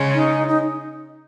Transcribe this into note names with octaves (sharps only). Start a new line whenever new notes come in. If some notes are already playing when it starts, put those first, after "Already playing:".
Already playing: C#3 G#3 C#4
D#4
D#4